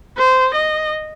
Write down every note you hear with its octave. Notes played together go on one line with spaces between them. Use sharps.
C5
D#5